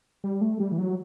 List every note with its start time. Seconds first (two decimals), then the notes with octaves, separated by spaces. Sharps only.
0.24 G3
0.41 A3
0.60 G3
0.72 E3
0.78 F#3